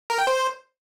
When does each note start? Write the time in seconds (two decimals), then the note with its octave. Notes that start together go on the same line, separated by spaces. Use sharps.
0.10 A#4
0.18 G5
0.27 C5